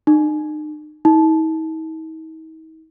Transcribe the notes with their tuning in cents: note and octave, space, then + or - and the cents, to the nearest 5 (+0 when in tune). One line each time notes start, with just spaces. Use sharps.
D#4 -40
D#4 +45